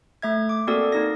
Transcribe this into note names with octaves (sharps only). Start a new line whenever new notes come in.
A3 E5 G#6
D6
A#3 C4 F#4 A4 D5
A#3 D#4 A#6